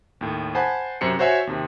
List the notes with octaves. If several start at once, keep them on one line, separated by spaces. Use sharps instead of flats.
D#2 A2
C5 F#5 G#5 A5 B5
F#2 C3 C5 C#7
F#4 C5 C#5 E5 G#5
D#2 C3